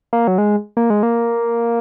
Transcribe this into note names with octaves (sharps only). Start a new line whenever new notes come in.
A#3
F#3
G#3
A#3
G#3
A#3